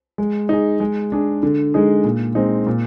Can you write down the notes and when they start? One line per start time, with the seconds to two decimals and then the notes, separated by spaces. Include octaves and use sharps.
0.18 G#3
0.49 D#4 G#4
0.80 G#3
1.12 D4 G#4
1.43 D3
1.74 G#3 D#4 G#4
2.04 A#2
2.35 G#3 C4 D#4
2.67 A#2